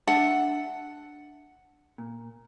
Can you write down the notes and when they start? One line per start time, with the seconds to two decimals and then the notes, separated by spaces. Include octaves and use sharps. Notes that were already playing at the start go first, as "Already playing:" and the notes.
0.07 D4 E5 F#5 A5
1.98 A#2